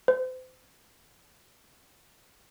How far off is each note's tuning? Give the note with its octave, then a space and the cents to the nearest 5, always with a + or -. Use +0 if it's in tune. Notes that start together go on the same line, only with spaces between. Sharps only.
C5 -35